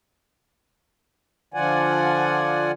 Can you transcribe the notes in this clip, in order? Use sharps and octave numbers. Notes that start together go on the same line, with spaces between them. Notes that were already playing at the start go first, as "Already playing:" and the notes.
D3 F3 F4 D5 F#5 G#5